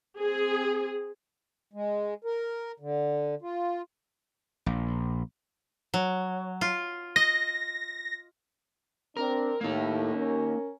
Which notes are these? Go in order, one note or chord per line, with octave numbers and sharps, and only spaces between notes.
C4 G#4
G#3
A#4
D3
F4
A#1
F#3
F4
D#5 A#6
C4 D4 A#4
A2 A#3 D#4
C#4 A#4